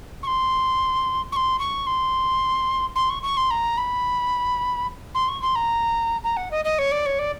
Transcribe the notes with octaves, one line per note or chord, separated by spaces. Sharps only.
C#6
C6
C#6
C6
C#6
C6
C6
C#6
C#6
C6
A#5
B5
C6
C#6
C6
A#5
A#5
F#5
D#5
D#5
C#5
D5
C#5
D5